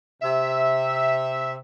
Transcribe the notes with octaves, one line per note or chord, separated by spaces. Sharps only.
C3 E5